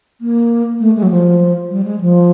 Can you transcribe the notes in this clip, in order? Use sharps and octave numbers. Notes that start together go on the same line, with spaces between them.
A#3
A3
G#3
F#3
F3
G3
G#3
F3